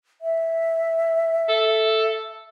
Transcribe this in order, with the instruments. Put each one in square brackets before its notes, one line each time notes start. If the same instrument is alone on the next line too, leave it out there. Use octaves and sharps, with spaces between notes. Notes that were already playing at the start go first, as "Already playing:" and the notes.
[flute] E5
[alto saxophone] A4